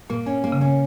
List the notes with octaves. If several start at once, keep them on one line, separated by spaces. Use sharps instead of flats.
A#2 A#3
C#4
A#3
C#3
C#4